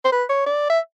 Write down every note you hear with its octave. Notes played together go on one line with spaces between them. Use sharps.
C5
B4
C#5
D5
E5